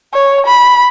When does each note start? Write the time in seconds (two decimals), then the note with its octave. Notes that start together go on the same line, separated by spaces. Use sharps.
0.14 C#5
0.47 B5